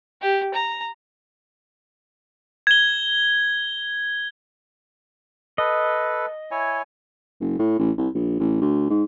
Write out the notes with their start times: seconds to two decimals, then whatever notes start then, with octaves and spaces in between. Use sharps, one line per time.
0.22 G4
0.54 A#5
2.67 G#6 G7
5.58 A4 B4 D#5
6.51 E4 C#5 G#5
7.40 F#1
7.59 A2
7.79 A1
7.98 C2
8.14 A#1
8.39 A1
8.61 D2
8.90 G#2